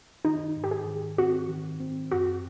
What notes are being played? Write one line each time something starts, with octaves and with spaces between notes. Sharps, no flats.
D#3 D#4
G#2
G4
G#4
D#3
C4 F#4
D#3
C4
F#2 F#4